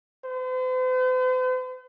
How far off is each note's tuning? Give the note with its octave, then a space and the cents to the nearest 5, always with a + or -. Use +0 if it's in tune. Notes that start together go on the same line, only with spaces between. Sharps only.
C5 -45